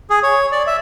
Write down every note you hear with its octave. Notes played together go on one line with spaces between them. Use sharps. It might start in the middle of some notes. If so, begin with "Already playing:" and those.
G#4
C#5
D5
E5